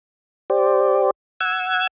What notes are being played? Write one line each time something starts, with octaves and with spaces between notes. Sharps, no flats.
G4 C5 D5
F#5 E6 G#6